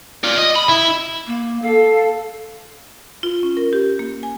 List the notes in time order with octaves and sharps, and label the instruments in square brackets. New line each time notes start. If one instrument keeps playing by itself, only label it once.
[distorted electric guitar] F4 D5
D#5
B5
E4
[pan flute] A#3
[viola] A4 [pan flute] F5
[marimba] F4
C#4
A#4
G4
A#3
G#5